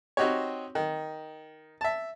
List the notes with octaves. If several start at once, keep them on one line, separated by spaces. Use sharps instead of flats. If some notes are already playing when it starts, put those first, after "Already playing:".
C4 D#4 F#4 G4 C#5
D#3
E5 A5